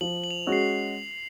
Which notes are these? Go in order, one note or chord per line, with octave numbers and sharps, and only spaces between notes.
F3 F#7
F#7
F7
G#3 C#4 F#4
C7